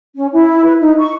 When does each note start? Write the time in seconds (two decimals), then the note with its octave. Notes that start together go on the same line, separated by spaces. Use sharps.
0.16 C#4
0.33 E4
0.66 B4
0.80 D#4
0.99 C#6